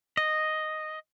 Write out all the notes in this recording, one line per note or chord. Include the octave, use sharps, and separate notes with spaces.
D#5